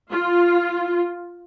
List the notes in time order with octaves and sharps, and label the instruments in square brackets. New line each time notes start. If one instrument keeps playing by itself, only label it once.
[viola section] F4